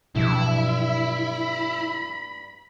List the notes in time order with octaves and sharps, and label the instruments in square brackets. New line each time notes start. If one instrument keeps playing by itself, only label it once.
[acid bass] G2 [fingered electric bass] B2 F3 F#3 [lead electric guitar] E4
[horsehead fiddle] B5